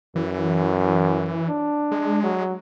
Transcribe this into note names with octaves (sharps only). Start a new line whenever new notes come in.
F#2 E3
D4
G#3
F#3